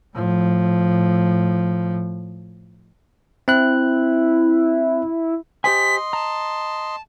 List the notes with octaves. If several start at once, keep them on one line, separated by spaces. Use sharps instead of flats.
A2 F3
C4 E4 F#6
G4 C5 D#5 G#5 C6 B6
A5 A#5